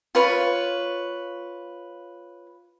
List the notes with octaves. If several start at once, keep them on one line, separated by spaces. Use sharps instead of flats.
F4 B4 C#5